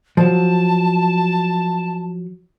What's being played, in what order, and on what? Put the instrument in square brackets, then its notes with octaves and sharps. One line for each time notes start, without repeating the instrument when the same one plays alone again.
[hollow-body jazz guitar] F3 F#3 [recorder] A5